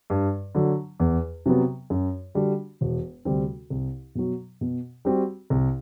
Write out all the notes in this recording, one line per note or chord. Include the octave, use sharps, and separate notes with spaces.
G2
D3 F#3
E2
C3 F#3 B3
F#2
D3 G3 D4 F#4
E1
D2 C3 G3 C4
C2
B2 F#3
B2
G3 C4 F#4
C2